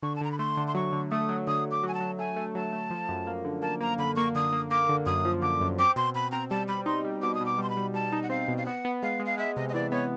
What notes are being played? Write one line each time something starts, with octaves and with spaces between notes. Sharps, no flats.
D3 C#6
A5
D3 A#5
B5
A3 C6
D3
C6
F#3 C#6
D3
A3 D#6
F#3
D3 D#6
D3
D6
F#3 G#5
A5
F#3
A3 G#5
A3
F#3 A5
A3
F3
F#2
A#3
D3
A#3 A5
A#3 A#5
D3 B5
A#3 C#6
D3 D#6
A#3
A#3 D6
D3
F#2 D#6
F3
D3 D6
F#2
C4 D6
B2 C6
B2 B5
C4 A#5
G3 A5
G3 B5
D#4 C6
G3
B2 D6
D#6
B2
D6
G3 C6
B5
G3
G3 A5
D#4
F#5
C4 F5
B2
F5
B3 F#5
B3
G#3 F5
G#3
F5
G#3 E5
C3 D#5
D#5
E3 D5
B3 C#5